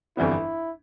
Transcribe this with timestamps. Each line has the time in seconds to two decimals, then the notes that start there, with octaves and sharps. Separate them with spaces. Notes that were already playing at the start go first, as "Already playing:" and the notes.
0.17 G1 F2 E3 G3 B3 E4